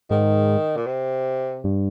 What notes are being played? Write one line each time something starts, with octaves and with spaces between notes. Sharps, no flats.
G#2 D#3
A#2
C3
G2